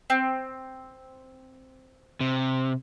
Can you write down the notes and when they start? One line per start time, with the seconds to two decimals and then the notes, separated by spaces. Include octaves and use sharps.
0.10 C4
2.21 C3